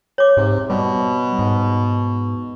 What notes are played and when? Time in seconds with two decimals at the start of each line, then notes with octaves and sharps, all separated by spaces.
0.18 C#5 D6
0.37 G#2 C3
0.70 B2 G3
1.39 G#2